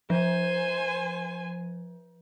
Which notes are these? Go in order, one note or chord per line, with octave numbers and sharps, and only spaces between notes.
F3 C5 G#5